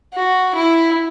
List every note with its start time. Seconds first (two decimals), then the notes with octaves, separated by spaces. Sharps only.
0.14 F#4
0.55 E4